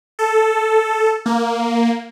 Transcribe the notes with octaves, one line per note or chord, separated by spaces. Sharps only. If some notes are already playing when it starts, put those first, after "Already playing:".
A4
A#3